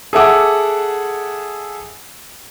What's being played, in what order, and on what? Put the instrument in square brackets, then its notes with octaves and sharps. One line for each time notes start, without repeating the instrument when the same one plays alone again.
[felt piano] G#4 A4 E5 F#5 D6